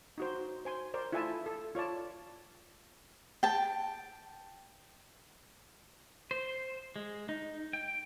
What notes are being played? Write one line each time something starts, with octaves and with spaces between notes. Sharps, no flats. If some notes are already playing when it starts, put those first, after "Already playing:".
D#4 F#4 C5
C5 G#5 C6
A#4 C5 D5
E4 F4 A4 E5 G#5 A5
A4
F4 C#5 D5 A5
G5 A5
C5
G#3
D#4
G5